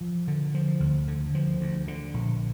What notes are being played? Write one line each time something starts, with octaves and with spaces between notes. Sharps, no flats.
F3
D3
F3
D2
D3
F3
D2
D3
A#1